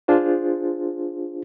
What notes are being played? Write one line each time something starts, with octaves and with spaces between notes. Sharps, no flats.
D4 F4 G#4 C5